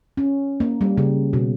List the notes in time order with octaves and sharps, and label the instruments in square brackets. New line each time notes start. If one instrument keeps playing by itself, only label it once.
[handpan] C#4
A#3
G3
C#3
B2